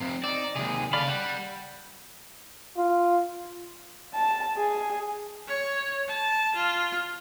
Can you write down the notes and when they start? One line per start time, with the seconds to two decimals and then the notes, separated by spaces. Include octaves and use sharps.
0.01 F2 C3
0.24 C4 D#4 D5
0.56 D#2 C3 G#4
0.93 C#3 A4 D5 F5 B5
1.08 G3 F#5
2.77 F4
4.14 A5
4.57 G#4
5.47 C#5
6.08 A5
6.55 F4